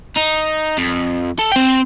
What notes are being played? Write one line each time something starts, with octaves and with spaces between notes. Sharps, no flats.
D#4
F2
A4
C4 G5